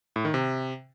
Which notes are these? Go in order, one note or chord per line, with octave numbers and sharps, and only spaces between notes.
A2
D#3
C3